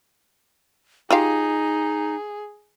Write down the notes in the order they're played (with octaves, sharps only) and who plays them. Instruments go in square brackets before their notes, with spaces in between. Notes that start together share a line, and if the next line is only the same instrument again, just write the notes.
[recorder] D#4 [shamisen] F4 G4 F5 [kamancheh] G#4